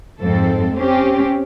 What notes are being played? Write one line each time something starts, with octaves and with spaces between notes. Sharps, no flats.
F2 G#2 C4 A4
C4 C#4 G4